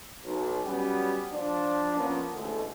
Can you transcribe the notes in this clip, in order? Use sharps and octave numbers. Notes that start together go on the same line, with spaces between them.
B1
F#3 G3 B3 C#4 G4
F3 D4
F3 A#3 B3 C#4
A1 D2 B2 D3 G#3